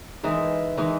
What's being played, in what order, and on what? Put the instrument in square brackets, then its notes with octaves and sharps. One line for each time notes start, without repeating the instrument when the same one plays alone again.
[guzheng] E3 [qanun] G#3 D#4 A#4
[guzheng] E3 [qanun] G#3 D#4 A#4